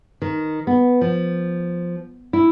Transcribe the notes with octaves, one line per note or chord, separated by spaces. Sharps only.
D#3
B3
F3
E4